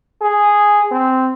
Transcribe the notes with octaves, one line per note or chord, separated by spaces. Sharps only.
G#4
C4